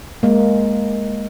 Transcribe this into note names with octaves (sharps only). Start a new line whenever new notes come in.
G#3 A#3